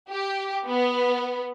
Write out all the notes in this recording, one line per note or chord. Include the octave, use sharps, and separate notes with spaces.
G4
B3